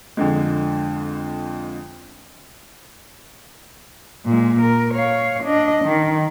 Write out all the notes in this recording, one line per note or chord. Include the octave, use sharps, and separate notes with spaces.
F2 D3 G#3
A#2 G#3
A#4
C#5 F5
D4 D#5
D#3